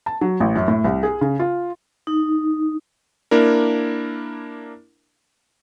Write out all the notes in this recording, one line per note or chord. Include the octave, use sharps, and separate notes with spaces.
A5
F#3
A1
F#2
A2
C2
G#4
C#3
F4
D#4
A#3 D4 E4 A#4